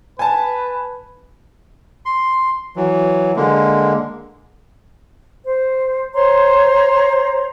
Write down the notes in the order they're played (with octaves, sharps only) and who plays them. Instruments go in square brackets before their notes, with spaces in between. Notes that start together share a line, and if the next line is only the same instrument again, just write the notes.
[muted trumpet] B4 [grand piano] G#5 A5
[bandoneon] C6
E3 F#3
D3 G#3 A#3
[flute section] C5
C5 C#5 A#5 C6